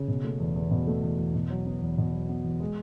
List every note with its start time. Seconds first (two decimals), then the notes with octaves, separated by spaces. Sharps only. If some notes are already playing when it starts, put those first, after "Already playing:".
Already playing: C#3
0.08 B2
0.24 A3
0.40 E2
0.56 E2
0.71 B2
0.87 A3
1.03 E2
1.18 E2
1.35 B2
1.50 F#3
1.66 B3
1.82 E2
1.98 B2
2.13 F#3
2.29 B3
2.44 E2
2.60 G#3